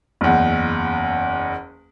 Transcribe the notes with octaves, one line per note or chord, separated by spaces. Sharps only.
F#1 E2